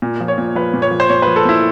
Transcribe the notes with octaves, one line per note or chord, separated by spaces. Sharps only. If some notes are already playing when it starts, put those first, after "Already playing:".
A#2
F3
C#5
A#2
F3 B4
A#2
C#5
F3
C5
A#2 C#5
B4
F3
A4
A#2 E4